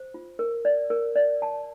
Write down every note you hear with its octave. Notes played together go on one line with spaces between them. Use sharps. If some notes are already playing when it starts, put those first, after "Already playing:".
Already playing: C5
F4
A#4
D5
A#4
D5
A5